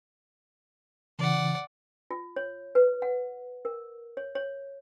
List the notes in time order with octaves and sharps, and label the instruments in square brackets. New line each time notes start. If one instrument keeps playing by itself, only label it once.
[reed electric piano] C#3 E3 [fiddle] D5 F#5
[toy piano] F4
C#5
B4
F#5
A#4
C#5
C#5